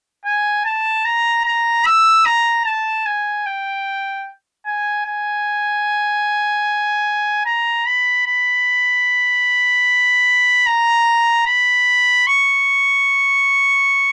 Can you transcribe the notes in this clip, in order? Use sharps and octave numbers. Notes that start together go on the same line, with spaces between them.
G#5
A5
A#5
A#5
E6
A#5
A5
G#5
G5
G#5
G#5
A#5
B5
B5
A#5
B5
C#6